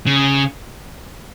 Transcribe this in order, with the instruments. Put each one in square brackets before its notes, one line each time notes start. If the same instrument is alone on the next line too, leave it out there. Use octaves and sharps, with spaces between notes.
[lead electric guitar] C#3